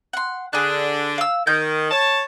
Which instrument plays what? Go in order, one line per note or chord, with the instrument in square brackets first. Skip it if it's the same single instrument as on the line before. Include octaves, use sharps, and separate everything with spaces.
[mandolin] F#5 C6
[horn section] D3 D4 [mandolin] G#4 F#6
[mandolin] F5 E6
[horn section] D#3 [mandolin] G6
[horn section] C#5 A5